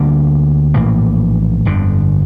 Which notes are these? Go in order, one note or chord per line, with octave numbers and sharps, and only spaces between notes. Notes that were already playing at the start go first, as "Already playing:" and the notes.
Already playing: D2 D3 G3 A#3
A#1 A2 E3 A#3
G1 F2 D3